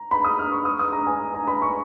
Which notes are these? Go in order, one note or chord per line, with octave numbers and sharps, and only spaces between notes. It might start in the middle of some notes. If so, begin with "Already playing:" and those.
Already playing: A#5
B5
D#6
F6
C#6
D#6
D#6
A#5
G#5
A#5
B5
C#6